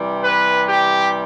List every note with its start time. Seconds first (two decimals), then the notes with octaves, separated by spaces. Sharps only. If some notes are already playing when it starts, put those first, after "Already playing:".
Already playing: C3 E3 G3
0.23 B4
0.68 G4